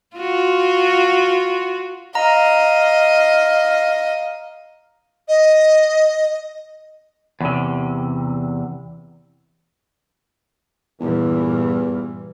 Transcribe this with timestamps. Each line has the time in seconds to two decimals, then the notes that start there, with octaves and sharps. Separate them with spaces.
0.16 F4 F#4
2.15 D#5 F5 A#5
5.28 D#5
7.41 E2 C3
11.00 E2 G2 A#2 E3